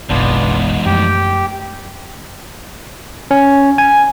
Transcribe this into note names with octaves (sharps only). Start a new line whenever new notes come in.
F#1 B1 E2 G#2 B2 B3 D4 F4
F#2 F3 A3 G4 G5
C#4
G#5